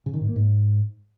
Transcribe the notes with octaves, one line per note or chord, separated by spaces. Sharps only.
C#3
D#3
G#2
A#3
G#2